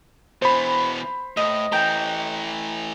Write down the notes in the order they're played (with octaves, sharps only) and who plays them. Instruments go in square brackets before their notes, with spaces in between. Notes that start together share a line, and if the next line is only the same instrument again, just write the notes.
[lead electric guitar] B2 E3 [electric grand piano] C5 B5
[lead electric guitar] A2 [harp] D#5
[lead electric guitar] E3 A3 [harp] G5 A#5